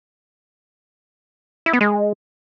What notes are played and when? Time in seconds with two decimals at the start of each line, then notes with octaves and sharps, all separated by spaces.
1.66 E4
1.73 B3
1.81 G#3